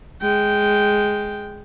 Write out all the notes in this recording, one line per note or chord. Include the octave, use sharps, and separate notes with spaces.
G#3 G5